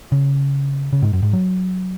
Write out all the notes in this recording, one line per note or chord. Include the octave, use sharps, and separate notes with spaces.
C#3
C#3
G#2
F#2
G#2
F#3